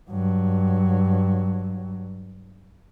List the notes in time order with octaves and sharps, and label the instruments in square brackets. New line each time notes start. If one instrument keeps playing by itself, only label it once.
[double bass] G2 F#3